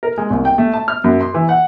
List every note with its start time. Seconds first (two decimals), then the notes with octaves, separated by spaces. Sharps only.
0.03 A#4
0.18 G#3
0.30 C2
0.45 G5
0.58 A3
0.74 A5
0.88 F6
1.04 F#2
1.21 C6
1.34 E3
1.49 F#5